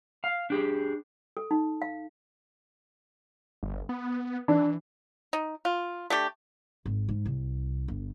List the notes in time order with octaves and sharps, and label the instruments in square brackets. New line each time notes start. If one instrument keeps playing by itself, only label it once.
[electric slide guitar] F5
D4 G4 G#4
[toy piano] A4
D#4
F5
[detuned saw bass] G1
B3
[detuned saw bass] E3 [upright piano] D4
[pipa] D#4
F4
A3 D4 G4
[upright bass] G#1
G#2
C2
G1